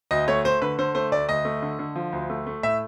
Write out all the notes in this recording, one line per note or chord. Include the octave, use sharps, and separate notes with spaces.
D2 D#5
A3 C#5
A3 C5
D3 B4
D3 C5
A3 C5
D2 D5
D2 D#5
A3
D3
D3
F3
D2
A3
A3
A2 E5